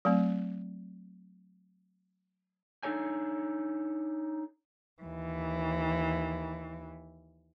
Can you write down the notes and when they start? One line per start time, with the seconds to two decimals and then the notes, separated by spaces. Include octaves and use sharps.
0.05 F#3 A3 C4
2.83 D4 D#4 A4 C#5 G#5
5.02 D#2 E3